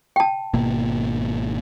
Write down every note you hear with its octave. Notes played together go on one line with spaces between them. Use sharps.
G5 A5
G#1 B2 A#3